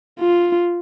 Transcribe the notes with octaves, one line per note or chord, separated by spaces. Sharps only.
F4